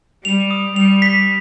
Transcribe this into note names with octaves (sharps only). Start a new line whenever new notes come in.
G3 F7
D#6
G3 F7
B6